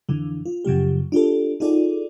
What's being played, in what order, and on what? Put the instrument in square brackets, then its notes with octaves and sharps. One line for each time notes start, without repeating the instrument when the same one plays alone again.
[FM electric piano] F2 D3 E3
F4
F#2 C#3 F3 G4
D4 F4 G4 A4
D#4 F4 F#4 G#4 A4 D5